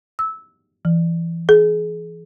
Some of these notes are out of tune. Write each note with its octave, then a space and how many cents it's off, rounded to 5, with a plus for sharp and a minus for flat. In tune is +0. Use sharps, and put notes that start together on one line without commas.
E6 -15
E3 +25
G#4 +30